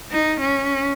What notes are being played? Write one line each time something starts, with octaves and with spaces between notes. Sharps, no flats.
D#4
C#4